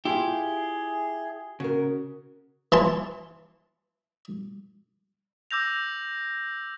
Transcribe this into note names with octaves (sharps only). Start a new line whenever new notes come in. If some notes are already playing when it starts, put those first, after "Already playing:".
E4 F4 G4 G#4 E5
C#3 F#4 A#4
E3 A5 C6
D6 E6 G6 A#6 F7